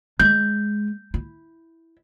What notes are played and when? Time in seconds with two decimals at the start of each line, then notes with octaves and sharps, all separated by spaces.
0.20 G#3 G6
1.14 E4